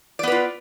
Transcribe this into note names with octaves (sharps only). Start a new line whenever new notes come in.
B3 F4 B4 D5